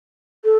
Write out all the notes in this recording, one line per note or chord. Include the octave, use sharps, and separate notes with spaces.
A4